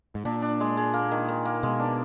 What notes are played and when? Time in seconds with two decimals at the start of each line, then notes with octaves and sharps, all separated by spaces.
0.15 G#2
0.25 A#2 D4
0.42 D4
0.60 G#3
0.77 G#3
0.93 A#3
1.11 D#3
1.28 D#3
1.45 A#3
1.63 B2 G#3
1.79 D4